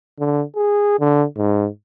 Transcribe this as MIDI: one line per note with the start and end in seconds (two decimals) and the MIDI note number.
0.20 0.43 50
0.56 0.99 68
1.00 1.25 50
1.37 1.68 44